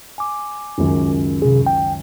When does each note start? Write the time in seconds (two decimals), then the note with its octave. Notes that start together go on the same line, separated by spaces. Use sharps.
0.18 G#5 D6
0.78 C#2 F#2 D#3
1.42 C3 G#4
1.66 G5